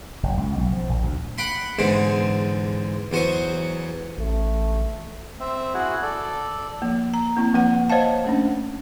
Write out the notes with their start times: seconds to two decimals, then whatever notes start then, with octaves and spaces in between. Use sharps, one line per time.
0.23 F#1
0.37 C#2
0.58 B1
0.73 F3
0.89 A#1
1.03 D2
1.38 F#5 G5 B5 C6
1.79 E2 G#2 D3 G#3 C4
3.12 E2 F#3 C5 C#6 D#6
4.18 A1 A3
5.40 C4 E5
5.74 E4 F#4 G#4 F#5
6.02 A4 D5
6.82 F3 A#3
7.14 A#5
7.37 A#3 C4 E4
7.54 F3 A#3 B4 F#5
7.90 C5 C#5 D#5 F5 A5
8.25 A3 C#4 D4